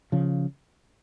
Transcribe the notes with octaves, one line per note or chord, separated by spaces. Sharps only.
C#3 F3